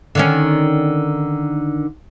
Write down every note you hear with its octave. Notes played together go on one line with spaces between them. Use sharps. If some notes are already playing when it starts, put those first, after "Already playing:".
D3 D#3 C#4